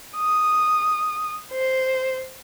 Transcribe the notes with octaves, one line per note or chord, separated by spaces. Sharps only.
D#6
C5